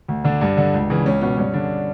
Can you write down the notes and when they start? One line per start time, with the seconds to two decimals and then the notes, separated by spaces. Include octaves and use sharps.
0.08 D2
0.25 D3 D4
0.41 G2
0.57 D3
0.74 C#2
0.90 C#3 E3
1.06 C#2 C#4
1.21 B2 C#4
1.37 G2 C#4
1.54 D3 D4